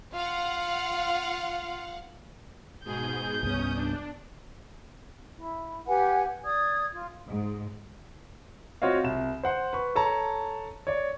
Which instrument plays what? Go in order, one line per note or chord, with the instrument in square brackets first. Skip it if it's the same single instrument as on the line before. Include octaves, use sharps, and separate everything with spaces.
[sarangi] F4 [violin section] F5 F#5
[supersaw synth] G#2 B2 G#4 [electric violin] G6
[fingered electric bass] C2 G2 B3 [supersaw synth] C#4 D#6
[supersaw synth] D4
[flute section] E4
G4 B4 F#5 G#5
D5 D#6 G#6
F4
[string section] G#2
[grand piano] C4 F4 F#4 C#5 D#5 F5
C2 E7
C5 F#5 C6
B4 C#6
A4 C#5 A5 A#5
C#5 D5